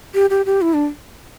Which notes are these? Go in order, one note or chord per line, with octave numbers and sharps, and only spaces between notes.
G4
G4
G4
E4
D4